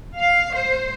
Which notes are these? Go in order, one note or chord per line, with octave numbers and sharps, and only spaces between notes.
F5
C5